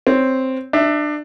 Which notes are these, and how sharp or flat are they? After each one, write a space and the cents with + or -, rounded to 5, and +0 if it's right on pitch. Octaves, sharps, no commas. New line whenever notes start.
C4 +0 C#5 +0
D4 +25 E5 +0